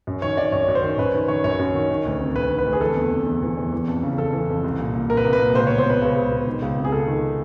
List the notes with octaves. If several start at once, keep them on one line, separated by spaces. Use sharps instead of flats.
F#2
D#3 C#5
D#3 D5
F#2 C#5
F#2
C5
D#3
F#2 B4
D#3
D#3 C#5
F#2 C#5
F#2
D#3
D#3
D2
C3
D2 B4
D#3
B4
D2
G#4
E3 A4
E2
C3
E2
E3
E2
E3
F2
C#3
F2 A4
E3
F2
C2
A#2
A#2
C2 A#4
B4
C2 A#4
B4
A#2
C#2 C5
B2 C#5
C5
B2 B4
C#2
C#2
B2
D#3
C#2
C3
G#4
C#2 A4
D#3